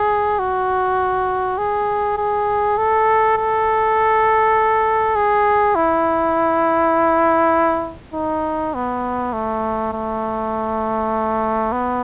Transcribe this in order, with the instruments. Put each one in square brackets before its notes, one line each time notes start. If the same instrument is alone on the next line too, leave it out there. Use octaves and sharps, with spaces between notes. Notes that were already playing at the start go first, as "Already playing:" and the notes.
Already playing: [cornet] G#4
F#4
G#4
G#4
A4
A4
G#4
E4
D#4
B3
A3
A3
B3